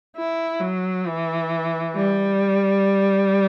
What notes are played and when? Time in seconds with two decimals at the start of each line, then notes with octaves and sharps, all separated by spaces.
0.16 E4
0.61 F#3
1.06 E3
1.95 G3